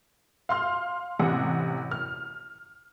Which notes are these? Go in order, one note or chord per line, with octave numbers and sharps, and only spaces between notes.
F5 C6 F6
A1 C3 F#5
F6